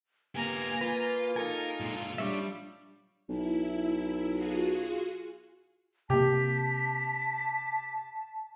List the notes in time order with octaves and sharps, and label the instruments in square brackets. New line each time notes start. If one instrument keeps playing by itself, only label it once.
[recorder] A#3 [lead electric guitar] B3 G4 [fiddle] G#5 A#5
[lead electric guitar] F4 [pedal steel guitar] B4
[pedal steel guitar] D#4 A4 G#5 [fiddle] F4 [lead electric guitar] A#4
[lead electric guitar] A#2 G#3
[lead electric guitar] G3 [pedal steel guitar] D4 C#5 E5
[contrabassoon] B1 [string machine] E4
[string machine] F4 F#4 G#4
[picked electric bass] C3 A#3 [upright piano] G4 [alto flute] A5 [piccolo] B6